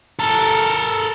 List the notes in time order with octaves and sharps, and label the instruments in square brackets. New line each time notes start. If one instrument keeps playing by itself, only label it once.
[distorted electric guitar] A4 A#4